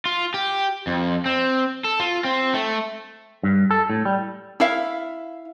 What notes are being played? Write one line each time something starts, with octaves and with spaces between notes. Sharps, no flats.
F4
G4
F2
C4
A4
F4
C4
A3
G2
A4
A2
G3
E4 E5 F5